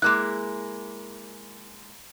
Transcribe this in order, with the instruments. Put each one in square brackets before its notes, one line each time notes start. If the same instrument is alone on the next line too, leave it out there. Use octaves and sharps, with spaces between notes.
[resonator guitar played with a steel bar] G#3 A#3 E4 [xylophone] F#6